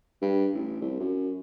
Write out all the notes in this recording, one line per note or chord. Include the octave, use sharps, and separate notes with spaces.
G2
A1
C2
F#2